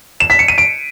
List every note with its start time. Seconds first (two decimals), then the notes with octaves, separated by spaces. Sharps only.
0.20 E7
0.30 B6
0.39 C#7
0.48 D#7
0.58 D7